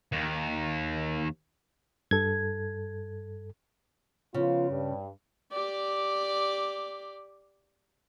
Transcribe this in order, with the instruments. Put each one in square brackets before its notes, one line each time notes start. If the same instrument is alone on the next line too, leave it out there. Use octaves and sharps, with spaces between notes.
[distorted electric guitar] D#2 D#3
[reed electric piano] G2 A4 [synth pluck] G#6
[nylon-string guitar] C#3 [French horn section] F3 B3 F4
[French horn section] G2
[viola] G4 D5